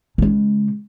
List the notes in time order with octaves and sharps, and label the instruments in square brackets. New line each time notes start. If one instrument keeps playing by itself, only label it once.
[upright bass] C#3 G#3